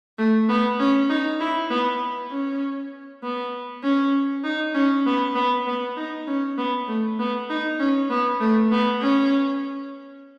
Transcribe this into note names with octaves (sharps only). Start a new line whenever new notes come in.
A3
B3
C#4
D#4
E4
B3
C#4
B3
C#4
D#4
C#4
B3
B3
B3
D#4
C#4
B3
A3
B3
D#4
C#4
B3
A3
B3
C#4